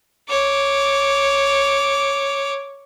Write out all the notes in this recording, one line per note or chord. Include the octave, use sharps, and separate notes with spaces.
C#5 D6